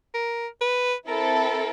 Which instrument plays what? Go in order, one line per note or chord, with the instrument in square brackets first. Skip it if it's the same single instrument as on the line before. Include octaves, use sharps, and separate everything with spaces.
[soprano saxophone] A#4
B4
[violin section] C4 E4 A4 [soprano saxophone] A#4